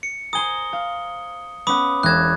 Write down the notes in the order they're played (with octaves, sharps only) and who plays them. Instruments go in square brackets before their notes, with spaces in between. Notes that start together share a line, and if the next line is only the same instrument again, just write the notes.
[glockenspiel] C#7
[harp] C5 G#5 A#5 [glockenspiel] D#6 G7
[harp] F5
[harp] B3 C#4 F#5 [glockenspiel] B5 D6 D#6
[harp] E1 A#6 E7 [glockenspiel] F#6 G#6